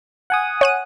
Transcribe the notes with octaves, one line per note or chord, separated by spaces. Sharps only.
F#5 G#5 D#6
C#5 F#6 D#7